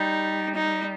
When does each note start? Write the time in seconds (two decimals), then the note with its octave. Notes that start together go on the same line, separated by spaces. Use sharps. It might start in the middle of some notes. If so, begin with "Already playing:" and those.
Already playing: G3 D#4
0.55 D#4